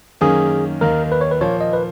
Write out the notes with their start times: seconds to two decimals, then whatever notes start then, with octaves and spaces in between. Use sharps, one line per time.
0.21 F#2 D#3 A#3 C#4 G#4
0.81 D#2 D#3 A#3 D#4 A#4
1.12 B4
1.21 C#5
1.31 B4
1.41 A#2 F3 A#3 C#5
1.61 D#5
1.73 B4